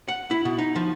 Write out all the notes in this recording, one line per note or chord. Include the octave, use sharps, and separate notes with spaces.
F#5
E4
B2
D#4
F3